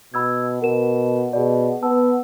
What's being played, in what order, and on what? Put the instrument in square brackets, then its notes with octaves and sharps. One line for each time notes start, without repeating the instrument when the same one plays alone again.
[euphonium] B2 [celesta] B5 E6 G#6
[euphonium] B2 [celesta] A#4 E7
[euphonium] B2 [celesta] G#4 D5
[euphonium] B3 [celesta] A5 E6